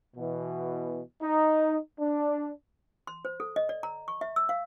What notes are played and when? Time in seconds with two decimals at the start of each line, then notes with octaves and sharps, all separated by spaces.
0.15 B2 E3
1.21 D#4
1.99 D4
3.07 C6
3.25 C5
3.40 A4
3.56 D#5
3.69 D5
3.83 A#5
4.08 C#6
4.21 E5
4.36 E6
4.49 F5